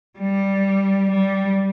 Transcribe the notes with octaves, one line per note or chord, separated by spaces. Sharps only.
G3
G3